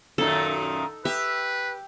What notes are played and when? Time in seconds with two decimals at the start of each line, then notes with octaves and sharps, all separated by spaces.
0.18 F#2 A#2 D#3 D#4 A4
1.05 G4 B4 E5